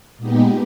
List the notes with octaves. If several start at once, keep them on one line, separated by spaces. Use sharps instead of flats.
A#2 G#3 B3 D#4 G4